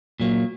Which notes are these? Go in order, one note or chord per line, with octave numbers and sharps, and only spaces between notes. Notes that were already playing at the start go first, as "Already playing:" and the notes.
A#2 F#3 A#3